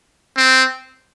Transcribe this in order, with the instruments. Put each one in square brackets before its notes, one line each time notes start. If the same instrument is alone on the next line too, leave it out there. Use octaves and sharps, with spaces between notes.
[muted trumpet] C4